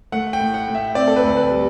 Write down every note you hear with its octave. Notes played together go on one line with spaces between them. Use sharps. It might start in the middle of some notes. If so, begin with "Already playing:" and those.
A3 F#5
G5
A2
F#5
A2
E5
C4 D5
A4
B4
D2
B4
G3